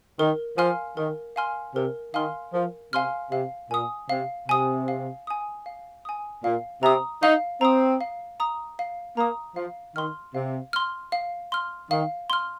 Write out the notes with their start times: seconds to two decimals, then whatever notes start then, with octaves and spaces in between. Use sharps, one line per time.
0.19 D#3 A#4
0.58 F3 F5 G#5 C6 F6
0.97 D#3 A#4
1.36 F5 G#5 C6 F6
1.75 C3 A#4
2.14 D#3 F5 G#5 C6 F6
2.54 F3 A#4
2.93 C3 F5 G#5 C6 F6
3.31 C3 F5
3.71 A#2 G#5 D#6
4.09 C3 F5
4.49 C3 G#5 D#6
4.88 F5
5.27 G#5 D#6
5.66 F5
6.05 G#5 D#6
6.44 A#2 F5
6.83 C3 A#5 D#6
7.23 D#4 F5
7.61 C4 A#5 D#6
8.01 F5
8.40 A#5 D#6
8.79 F5
9.17 A#3 A#5 D#6
9.56 F3 F5
9.96 D#3 C6 F6
10.35 C3 F5
10.73 C6 F6
11.12 F5
11.52 C6 F6
11.91 D#3 F5
12.30 C6 F6